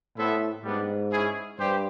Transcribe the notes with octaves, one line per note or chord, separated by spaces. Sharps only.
A2 B3 E4 A4 C5 E5
G#2 G3 B3 D4
C#4 E4 G#4
G2 G4 C5